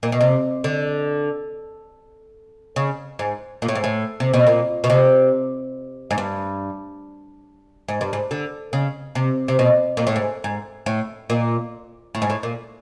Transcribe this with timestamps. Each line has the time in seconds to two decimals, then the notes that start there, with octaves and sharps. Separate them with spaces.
0.03 A#2
0.12 B2
0.21 C3
0.64 D3
2.76 C#3
3.19 G#2
3.62 A#2
3.68 A2
3.75 G#2
3.84 A2
4.20 C3
4.34 B2
4.47 A#2
4.84 B2
4.90 C3
6.11 G#2
6.18 G2
7.89 G#2
8.01 G2
8.13 G#2
8.31 D3
8.73 C#3
9.15 C3
9.48 C3
9.59 B2
9.97 A#2
10.07 A2
10.16 G#2
10.44 G#2
10.86 A2
11.30 A#2
12.15 A2
12.22 G#2
12.30 A2
12.43 A#2